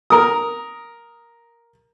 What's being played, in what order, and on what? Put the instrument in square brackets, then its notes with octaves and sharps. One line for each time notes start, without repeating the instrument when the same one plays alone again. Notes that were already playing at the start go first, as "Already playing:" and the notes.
[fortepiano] A#4 D#6